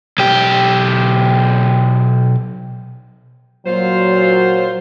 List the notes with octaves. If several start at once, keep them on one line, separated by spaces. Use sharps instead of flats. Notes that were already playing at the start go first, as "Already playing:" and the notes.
B1 G4
A#2 F#3 F4 C5